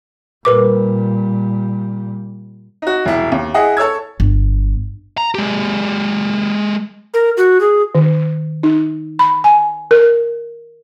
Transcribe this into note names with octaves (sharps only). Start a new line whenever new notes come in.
A#2 G3 A#4 B4 D6
D#4 F#4
E1 C2 E4
D#2
E4 G#4 D#5 F#5
A4 C#5 E6 G#6
G1
A#5
G#3 G4
A#4
F#4
G#4
D#3
D#4
B5
G#5
A#4